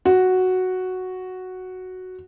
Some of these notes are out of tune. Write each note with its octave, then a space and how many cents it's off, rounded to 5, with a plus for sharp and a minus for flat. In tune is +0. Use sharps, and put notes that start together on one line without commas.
F#4 +0